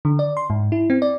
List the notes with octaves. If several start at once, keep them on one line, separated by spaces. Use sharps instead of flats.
D3
D5
C6
G#2
E4
C4
D5